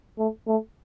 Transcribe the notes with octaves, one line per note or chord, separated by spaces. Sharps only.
A3
A3